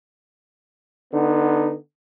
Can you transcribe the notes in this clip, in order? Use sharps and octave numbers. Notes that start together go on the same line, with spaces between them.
D3 B3 D#4